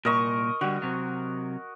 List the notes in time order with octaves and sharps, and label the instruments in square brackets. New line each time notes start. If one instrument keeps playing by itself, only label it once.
[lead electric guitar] C2 A#2 [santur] A#4 D#5 C#6
[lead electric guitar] D3 G3 [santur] F#4
[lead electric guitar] C3 F#3